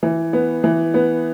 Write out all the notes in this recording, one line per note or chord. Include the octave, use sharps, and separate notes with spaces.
E3
B3
E3
B3